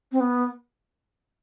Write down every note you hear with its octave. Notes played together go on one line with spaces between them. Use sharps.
C4
B3